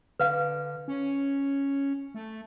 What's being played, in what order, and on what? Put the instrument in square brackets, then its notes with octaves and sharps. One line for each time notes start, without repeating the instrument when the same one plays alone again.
[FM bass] D3 [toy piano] B4 F5
[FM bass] C#4
A3